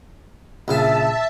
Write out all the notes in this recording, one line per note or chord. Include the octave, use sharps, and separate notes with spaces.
A#1 C#3 E5 F5 A5